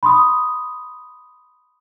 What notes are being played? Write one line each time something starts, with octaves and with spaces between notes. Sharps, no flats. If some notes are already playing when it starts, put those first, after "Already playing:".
B5 C6 D#6